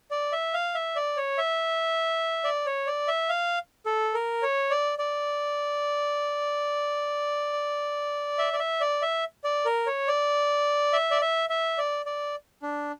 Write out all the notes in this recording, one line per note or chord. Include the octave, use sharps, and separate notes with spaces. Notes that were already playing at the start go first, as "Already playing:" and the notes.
D5
E5
F5
E5
D5
C#5
E5
D5
C#5
D5
E5
F5
A4
A#4
C#5
D5
D5
E5
D5
E5
D5
E5
D5
A#4
C#5
D5
E5
D5
E5
E5
D5
D5
D4